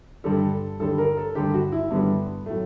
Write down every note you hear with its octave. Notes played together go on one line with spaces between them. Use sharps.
G2 D3 G3 A4
G2 D3 G3 A4
A#4
A4
G2 D3 G3 G4
F#4
E4
G2 D3 G3 B3
A2 F#3 A3